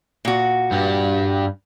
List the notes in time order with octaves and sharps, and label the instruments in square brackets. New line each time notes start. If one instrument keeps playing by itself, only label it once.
[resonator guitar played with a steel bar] A#2 F#4
[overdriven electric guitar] G2 G3